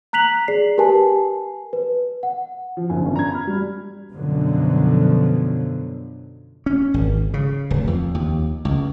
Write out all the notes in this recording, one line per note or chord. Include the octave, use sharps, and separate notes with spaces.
A#5 F#6 B6 F7 F#7
G#4 D5 C7
G4 A#4 B4 G#5 A5
B4
F#5
F3
F#1 D#3 G#5
G1 D3 C#4 D4
A#5 G#6
B5 F6
G3
F#2 B2 D3 F3 F#3
C#4
G#1
C#3
D1
F2
D#2
C#2